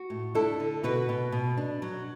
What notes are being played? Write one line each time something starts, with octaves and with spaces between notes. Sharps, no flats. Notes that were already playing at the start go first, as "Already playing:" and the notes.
Already playing: F#4
A2
D4 E4 A4
D3
B2 F#4 B4
B2
B2
D4
F#3